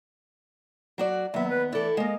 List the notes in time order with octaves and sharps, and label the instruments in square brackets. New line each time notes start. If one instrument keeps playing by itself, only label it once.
[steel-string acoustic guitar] F#3 F#4 D5
[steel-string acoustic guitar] D#2 B3 [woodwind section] F#3 E5
[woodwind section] B4
[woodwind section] E3 A3 D5 [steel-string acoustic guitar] E4 A4
[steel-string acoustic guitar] G#3 A#3 [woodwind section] D#5